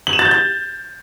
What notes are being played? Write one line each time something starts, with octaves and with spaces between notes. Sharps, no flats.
F#7
E7
A6
G6
A6